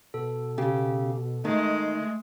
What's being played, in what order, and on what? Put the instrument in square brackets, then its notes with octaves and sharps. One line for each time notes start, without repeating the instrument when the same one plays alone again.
[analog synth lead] B2 [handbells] A4
[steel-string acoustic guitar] C#3 G4
[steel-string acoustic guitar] D#3 [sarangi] G#3 [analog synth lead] A3